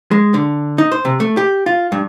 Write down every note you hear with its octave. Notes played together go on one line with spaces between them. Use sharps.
G#3
D3
D#4
C5
C3
A3
G4
F4
G2